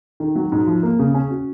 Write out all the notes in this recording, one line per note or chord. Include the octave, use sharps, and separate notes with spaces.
D#3
F#3
G#2
F3
A#3
C#3
C#4
F#4